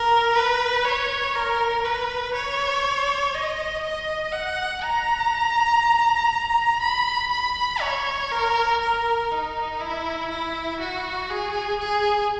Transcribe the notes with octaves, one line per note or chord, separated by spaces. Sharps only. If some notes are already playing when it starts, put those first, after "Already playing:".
Already playing: A#4
B4
C#5
A#4
B4
C#5
D#5
D#5
F#5
A#5
B5
B5
C#5
A#4
A#4
D#4
E4
E4
F#4
G#4
G#4